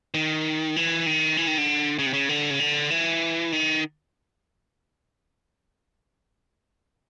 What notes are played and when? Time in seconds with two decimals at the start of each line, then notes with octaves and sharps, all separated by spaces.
0.14 D#3
0.76 E3
1.06 D#3
1.37 E3
1.47 D#3
1.58 D3
1.99 C#3
2.06 C3
2.13 C#3
2.29 D3
2.51 C#3
2.60 D3
2.90 E3
3.52 D#3